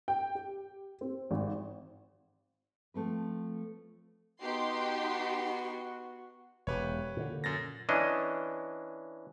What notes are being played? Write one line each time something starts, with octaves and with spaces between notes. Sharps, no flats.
G5
G4
C4
G#1
F3 A3 C4 B4
B3 D#4 F#4 G4 C6
E1 G4 B4 C#5
A#2 D3
F#2 A6 A#6
E3 C#4 D4 D#5